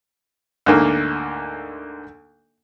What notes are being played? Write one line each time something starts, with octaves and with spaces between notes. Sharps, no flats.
D2 G#2 D3 A#3